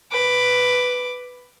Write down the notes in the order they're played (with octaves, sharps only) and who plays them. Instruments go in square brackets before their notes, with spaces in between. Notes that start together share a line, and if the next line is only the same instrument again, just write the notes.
[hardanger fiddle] B4 D6